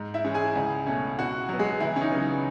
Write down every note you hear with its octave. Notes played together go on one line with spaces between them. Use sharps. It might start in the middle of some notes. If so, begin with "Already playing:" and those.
Already playing: G#2
E4 E5
E3 G#3 C#4
G#4 G#5
C#2
B2 A3 C#4
B2 F#4 F#5
F#3 B3
G#3 G#4
C#2 E3 E4
C#4
D#4
C#3 F#3 B3